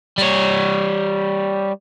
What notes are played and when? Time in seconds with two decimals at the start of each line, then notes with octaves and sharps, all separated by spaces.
0.18 G3 C#5